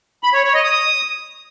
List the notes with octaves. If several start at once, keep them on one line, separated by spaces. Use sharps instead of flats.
B5
C#5
C#5
D#5
D#6